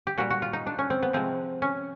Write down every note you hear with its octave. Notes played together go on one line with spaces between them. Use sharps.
G4
A#2 G3 F#4
F#4
F4
D#4
D4
C#4
C4
B3
C3 F3 G#3 C4
C#4